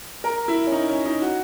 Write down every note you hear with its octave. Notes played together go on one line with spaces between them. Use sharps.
A#4
E4
C#4
D#4
C#4
D#4
F#4